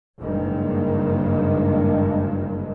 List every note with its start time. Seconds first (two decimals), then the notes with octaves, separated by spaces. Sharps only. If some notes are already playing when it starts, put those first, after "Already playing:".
0.19 F#1 G2 D#3 G#3 A#3